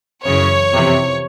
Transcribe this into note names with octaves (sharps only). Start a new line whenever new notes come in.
F#2 C#3 E3 C#5
F2 C3 E3